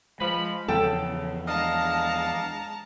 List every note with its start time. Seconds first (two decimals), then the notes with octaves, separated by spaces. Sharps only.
0.21 F3 G#3 B5
0.68 E2 C#3 E3 F3 A4 G5
1.47 G#3 D4 D#5 F5 A5 A#5